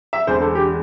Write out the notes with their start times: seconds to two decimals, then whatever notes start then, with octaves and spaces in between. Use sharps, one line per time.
0.13 E5
0.27 E1 E2 D3 C5
0.41 A4
0.55 G4